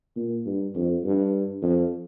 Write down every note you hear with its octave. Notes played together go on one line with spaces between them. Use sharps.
A#2
G2
F2
G2
F2